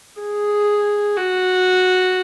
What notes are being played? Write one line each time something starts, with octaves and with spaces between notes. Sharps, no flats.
G#4
F#4